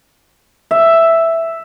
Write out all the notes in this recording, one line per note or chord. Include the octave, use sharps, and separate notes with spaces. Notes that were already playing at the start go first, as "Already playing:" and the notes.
E5